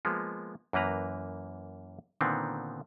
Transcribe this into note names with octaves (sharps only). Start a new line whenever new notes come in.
F3 G#3 A#3 B3
F#2 E3 A#3 B4 A#5
A#2 D3 D#3 B3 C4